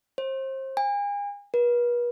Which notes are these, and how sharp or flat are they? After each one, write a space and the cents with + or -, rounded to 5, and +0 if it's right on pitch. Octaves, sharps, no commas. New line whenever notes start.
C5 +30
G#5 -40
B4 -40